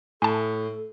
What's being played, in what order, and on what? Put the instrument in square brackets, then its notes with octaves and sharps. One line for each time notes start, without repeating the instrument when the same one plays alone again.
[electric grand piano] A2 [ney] A4 [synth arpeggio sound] G#5 A5